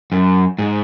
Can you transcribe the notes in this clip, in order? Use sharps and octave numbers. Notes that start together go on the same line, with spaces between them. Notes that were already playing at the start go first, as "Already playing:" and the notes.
F#2
G#2